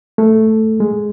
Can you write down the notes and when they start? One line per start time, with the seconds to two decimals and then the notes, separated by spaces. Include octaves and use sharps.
0.18 A3
0.80 G#3